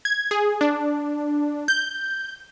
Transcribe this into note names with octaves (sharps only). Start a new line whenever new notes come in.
G#6
G#4
D4
G6